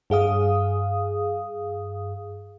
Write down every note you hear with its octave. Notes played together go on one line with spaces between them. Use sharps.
G2 G#4 F5 D#6